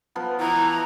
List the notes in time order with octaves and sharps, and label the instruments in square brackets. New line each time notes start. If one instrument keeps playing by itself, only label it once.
[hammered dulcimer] F3 B3
[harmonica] E3 [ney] A#5